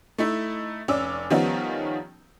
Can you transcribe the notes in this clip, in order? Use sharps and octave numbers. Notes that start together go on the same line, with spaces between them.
A3 D#4 E4
F1 C#4 D5 D6 E6
D#3 F3 G3 B3 C#4 D#4